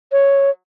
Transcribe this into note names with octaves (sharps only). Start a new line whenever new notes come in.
C#5